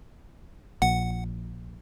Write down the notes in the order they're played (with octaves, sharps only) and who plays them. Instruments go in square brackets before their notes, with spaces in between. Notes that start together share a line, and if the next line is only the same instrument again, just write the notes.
[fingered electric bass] A#1 A#2 [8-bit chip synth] F#5